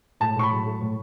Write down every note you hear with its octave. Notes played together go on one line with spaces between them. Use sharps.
A2 A5
A2 C#6
B5
F#3
A3
A2